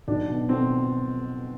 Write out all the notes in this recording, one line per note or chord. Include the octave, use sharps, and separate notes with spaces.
B1 D4
B2
B2 C4